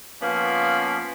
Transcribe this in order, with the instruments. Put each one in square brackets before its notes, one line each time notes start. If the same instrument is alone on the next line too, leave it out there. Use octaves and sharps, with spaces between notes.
[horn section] F3 A#3 B3 C#4